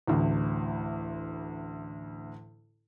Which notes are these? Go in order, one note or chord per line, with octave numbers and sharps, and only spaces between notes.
A1 D2